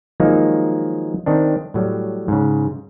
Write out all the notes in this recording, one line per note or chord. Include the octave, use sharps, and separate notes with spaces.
D#3 F3 F#3 G#3 A#3 D#4
D#3 C4 D4
A2 F#3 G3
G#2 C#3